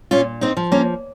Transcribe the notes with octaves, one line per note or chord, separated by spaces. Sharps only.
A#2 C#4 F4
C4 D#4
F3
A#3 C#4